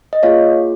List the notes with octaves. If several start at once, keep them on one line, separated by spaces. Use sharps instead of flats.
D#5
A#3 F4 G#4 C#5 F5